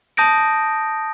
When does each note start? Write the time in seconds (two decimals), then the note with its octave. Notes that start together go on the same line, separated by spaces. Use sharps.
0.17 A5 D#6 G6 A#6 D7